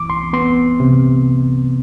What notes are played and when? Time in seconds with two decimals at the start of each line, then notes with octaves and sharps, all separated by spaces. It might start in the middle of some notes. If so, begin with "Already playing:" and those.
Already playing: C2 E3 D6
0.10 C6
0.33 B3 C6
0.80 C3